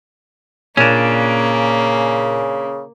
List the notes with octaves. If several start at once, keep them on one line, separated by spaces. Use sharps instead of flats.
A#2 C#3 A#3 C#4 D4